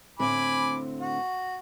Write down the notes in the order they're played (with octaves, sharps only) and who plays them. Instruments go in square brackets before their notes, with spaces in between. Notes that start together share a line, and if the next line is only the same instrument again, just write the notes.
[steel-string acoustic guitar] A2 D3 C4 [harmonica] G#5 B5 D6
[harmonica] F#4